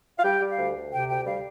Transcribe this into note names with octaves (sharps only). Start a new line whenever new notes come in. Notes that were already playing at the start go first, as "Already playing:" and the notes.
F5
G3 G5
G3
F5
D2
D2
C3 G5
D2 G5
G3 F5